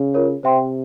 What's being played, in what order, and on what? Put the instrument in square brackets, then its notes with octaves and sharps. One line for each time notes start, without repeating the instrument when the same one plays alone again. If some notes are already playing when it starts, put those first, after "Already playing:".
Already playing: [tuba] C#3
[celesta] F4 A#4 C#5
[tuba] C3 [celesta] C5 E5 G5 C6